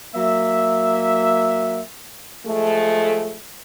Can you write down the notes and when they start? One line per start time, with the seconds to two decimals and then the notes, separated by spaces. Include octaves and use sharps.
0.16 F#3 A#3 E5
2.46 F3 G#3 A3